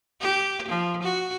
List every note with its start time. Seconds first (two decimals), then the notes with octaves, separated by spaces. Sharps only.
0.21 G4
0.68 F3
1.03 F#4